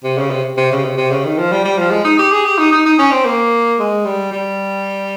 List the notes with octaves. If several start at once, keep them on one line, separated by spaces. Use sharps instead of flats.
C3
C#3
C3
C3
C#3
C3
C3
C#3
D#3
F3
G3
G3
F3
G#3
D#4
G4
G#4
G4
D#4
D#4
D#4
C#4
C4
A#3
G#3
G3
G3